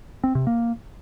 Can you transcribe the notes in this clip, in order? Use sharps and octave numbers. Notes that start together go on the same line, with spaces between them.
C4
C3
A#3